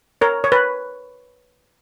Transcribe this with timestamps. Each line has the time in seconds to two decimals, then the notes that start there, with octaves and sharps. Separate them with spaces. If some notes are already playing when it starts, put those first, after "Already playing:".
0.21 A#4 C#5
0.44 C#5
0.52 B4